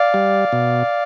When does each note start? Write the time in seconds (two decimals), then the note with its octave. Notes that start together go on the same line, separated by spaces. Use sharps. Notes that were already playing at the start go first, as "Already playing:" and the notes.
Already playing: D5 F5
0.14 G3
0.52 B2